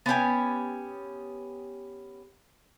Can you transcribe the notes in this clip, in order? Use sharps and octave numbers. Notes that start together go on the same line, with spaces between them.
B3 C#4 G4 G#5